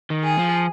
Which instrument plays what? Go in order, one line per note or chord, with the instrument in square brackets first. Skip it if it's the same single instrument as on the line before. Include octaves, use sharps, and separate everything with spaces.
[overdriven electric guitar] D#3
[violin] G#4
[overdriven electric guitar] F3